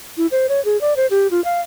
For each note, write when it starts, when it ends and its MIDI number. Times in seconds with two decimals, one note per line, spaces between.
0.17 0.27 64
0.31 0.47 72
0.49 0.63 73
0.65 0.79 68
0.81 0.94 74
0.97 1.07 72
1.11 1.27 67
1.31 1.43 65
1.44 1.61 77